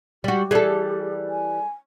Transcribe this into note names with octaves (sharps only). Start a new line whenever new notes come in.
G3 F#4 G4
E3 G3 G#4 A4
G#5